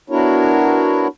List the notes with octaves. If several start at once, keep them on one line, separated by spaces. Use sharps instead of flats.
B3 D4 E4 F#4 A#4 C#5